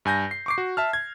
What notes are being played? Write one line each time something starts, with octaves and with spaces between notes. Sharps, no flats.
G2 G#5 G6 A#6
C7
C#6 D6 C7
F#4
E5 A5 F6
G#6